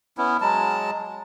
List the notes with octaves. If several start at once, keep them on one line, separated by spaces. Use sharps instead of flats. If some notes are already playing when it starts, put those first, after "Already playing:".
B3 C#4 E4
F#3 G#3 A5